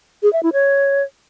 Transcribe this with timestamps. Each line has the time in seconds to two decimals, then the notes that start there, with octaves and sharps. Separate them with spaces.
0.23 G#4
0.33 E5
0.43 E4
0.53 C#5